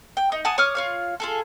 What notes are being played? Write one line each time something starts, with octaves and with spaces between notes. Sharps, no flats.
G5
D#4
F#5 G#5 A5 D#6
C#5 D6 D#6 F6
F4 C#5 F5
F4 G#4 A4